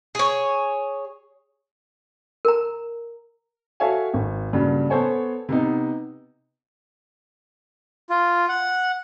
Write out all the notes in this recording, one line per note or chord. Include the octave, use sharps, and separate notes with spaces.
G#4 C#5
A#4 A#5
F#4 A4 C#5 E5 F5 G#5
G#1
G2 A#2 C#3 F#3
B3 A4 C5 C#5 G#5
C3 B3 D#4
F4
F#5